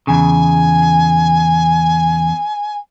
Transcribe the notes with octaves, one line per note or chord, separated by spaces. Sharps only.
E2 C#3 G#5